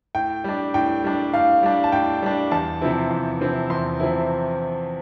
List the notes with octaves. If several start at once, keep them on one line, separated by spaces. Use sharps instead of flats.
A2 G5
G3 D4
A2 G5
G3 D4
A2 F5
G3 D4
A5
A2 G5
G3 D4
E2 A5
C3 F3 C4 E4
E2
C3 F3 C4 E4
E2 C6
C3 F3 C4 E4